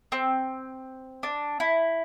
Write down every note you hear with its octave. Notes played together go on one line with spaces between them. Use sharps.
C4
D4
E4